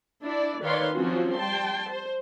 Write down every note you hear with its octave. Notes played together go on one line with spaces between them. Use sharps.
D4 E4 D5
D#3 B4 C#5 D5 F5 C6
F3 F#3 C4 C#4 F4 F#4
G3 G5 A5 C6
C5